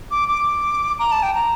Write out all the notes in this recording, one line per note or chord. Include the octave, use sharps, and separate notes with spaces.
D6
D6
A#5
A5
G5
A#5